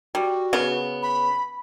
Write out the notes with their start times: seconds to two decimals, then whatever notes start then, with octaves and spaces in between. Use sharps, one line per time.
0.15 G3 F#4
0.53 C#3 B3
1.03 B5